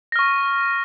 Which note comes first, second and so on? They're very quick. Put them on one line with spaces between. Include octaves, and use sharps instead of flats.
A#6 F6 C#6